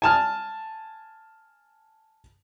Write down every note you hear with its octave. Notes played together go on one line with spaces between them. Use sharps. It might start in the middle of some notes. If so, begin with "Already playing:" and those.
G#5 A5 F6